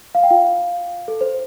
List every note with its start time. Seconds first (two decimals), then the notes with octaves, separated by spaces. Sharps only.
0.15 F5
0.23 G5
0.30 F4 F5
1.08 A4
1.21 C5